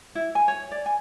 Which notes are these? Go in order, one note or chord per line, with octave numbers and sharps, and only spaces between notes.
E4
G#5
C#5
D5
G#5